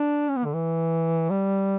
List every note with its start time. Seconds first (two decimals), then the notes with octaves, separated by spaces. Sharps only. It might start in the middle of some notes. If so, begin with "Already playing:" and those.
Already playing: D4
0.29 C#4
0.37 B3
0.45 D3
0.54 E3
1.31 G3